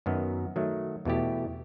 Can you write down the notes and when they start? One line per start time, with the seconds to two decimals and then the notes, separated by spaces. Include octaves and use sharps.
0.06 F#2 D#3 F#3 B3
0.56 D#3 F#3 A3
1.05 E2 B2 A3 E4 G4